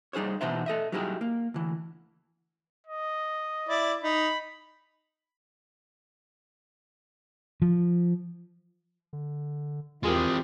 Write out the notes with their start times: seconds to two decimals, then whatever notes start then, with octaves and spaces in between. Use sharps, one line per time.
0.13 G3 D#4 G#4 C5 C#5
0.41 B2 E3 B3 D#4 C5 E5
0.66 A4 D#5 E5
0.92 F#3 G3 D#4 E4 G4 G#4
1.21 A#3
1.54 D2 E3
2.87 D#5
3.69 E4 D5 D6
4.03 D#4 B5
7.62 F3
9.13 D3
10.03 E2 E3 G#3 C4 F4 G4 G#4 A#4